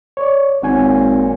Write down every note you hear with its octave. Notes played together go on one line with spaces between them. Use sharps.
C#5 D5
G#1 A#2 C#5 F#5 G#5